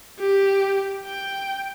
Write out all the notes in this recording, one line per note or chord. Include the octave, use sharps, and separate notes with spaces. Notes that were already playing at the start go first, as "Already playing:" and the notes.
G4
G5